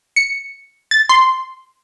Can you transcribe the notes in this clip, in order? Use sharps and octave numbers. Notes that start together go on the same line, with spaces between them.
C#7
A6
C6